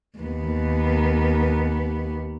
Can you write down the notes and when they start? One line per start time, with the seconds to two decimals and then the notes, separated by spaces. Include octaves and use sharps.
0.18 D#2 B3